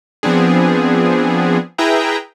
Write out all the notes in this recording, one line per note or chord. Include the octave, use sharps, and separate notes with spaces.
F3 B3 C4 D4 G#4
E4 G#4 B4 E5 G5 A#5